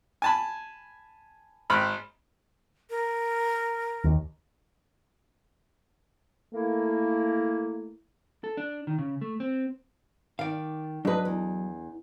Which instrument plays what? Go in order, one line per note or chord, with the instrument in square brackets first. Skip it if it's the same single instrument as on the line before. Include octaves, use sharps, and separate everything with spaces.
[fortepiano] G#5 A5 B5
G#1 B5 F6
[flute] A#4
[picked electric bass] D#2
[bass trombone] A3 [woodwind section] A#3 E4
[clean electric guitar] A4
D4
D#3
C#3
A3
C4
[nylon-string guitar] D#3 [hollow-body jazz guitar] D5 F5
[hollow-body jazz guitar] F#3 [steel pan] D4 D#5 [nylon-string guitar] G#4 B4
[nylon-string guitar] E2